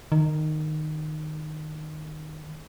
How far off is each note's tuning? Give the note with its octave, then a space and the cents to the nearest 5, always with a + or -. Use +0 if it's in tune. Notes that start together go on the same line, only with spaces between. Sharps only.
D#3 -15